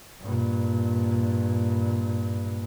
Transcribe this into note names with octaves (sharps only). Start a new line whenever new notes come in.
G2 A#2